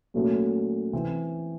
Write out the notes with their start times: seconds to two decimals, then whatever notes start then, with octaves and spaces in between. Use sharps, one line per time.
0.14 A#2 F#3 A3 C#4 F#4
0.93 E3 C4